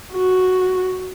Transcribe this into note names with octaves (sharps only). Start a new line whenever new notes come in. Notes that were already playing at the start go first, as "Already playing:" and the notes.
F#4